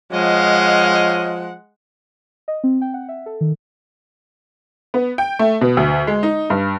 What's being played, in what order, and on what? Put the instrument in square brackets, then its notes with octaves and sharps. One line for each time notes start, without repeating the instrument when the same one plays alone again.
[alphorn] F3 [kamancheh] G#3 F#5 [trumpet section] C#5 D#5 F5
[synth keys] D#5
C4
G5
F#5
E5
A4
D#3
[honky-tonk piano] B3
G5
A3
B2
D2
G#3
D#4
G2